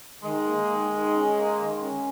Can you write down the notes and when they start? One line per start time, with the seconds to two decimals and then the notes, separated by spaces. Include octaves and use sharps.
0.23 D#3 G#3
0.46 A#3
0.69 D#3
0.91 D#3
1.13 C#4
1.36 A#3
1.59 D#3
1.81 C#4